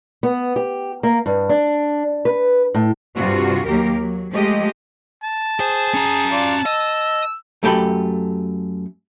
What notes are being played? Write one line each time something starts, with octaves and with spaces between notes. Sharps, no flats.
B3
G4
A#3
G2
D4
B4
A2
G2 C3 F4 F#4
D#2 F#3 A#3 G4 A#4
F#3
F3 G#3 A3 G4 D#5
A5
G#4 C5
C#4 A#5
F4 D5
D#5 E6
F#2 A3 G4 A4 G5 B5